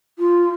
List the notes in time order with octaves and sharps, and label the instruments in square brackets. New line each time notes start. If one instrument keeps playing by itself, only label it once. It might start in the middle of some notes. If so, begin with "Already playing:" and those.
[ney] F4